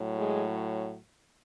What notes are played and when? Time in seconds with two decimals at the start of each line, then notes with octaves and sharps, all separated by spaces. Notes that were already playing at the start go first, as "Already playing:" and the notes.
Already playing: A2 F#3
0.18 G#3